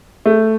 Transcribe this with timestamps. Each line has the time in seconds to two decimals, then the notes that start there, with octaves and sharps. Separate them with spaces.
0.26 A3